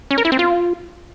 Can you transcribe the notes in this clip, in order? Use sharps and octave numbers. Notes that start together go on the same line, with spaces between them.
C#4
A#4
E4
C4
F4